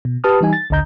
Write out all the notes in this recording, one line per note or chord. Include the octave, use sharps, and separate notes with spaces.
B2
G4 B4 A5 D#6 F6
E3 G3 D#4 G#5
A6
A1 D2 D3 D#5 A#5 G6